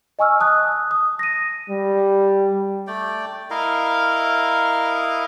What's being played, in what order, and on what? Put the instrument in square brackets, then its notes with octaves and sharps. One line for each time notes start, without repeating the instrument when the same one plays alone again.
[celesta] D#5 G#5 C#6 E6 F6
A5 D#6 F#6
D#6
A#6 D#7
[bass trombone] G3
[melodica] A3 D5 G5
E4 A#4 D#5 F5